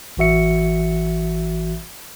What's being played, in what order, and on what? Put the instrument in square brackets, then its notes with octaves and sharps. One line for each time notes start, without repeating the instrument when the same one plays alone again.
[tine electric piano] A1 E3 F#4 E5 C#7